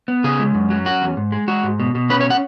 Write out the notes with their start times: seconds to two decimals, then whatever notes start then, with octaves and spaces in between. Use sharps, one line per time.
0.08 B3
0.24 C#3 G#4
0.39 G#3
0.54 F#2
0.70 F#3
0.86 C#4 F#4
1.02 E2
1.17 G#2
1.32 G#3
1.48 G#3 F#4
1.63 G#2
1.80 B2
1.95 B2
2.10 C#4 B4
2.21 C#5
2.30 F#5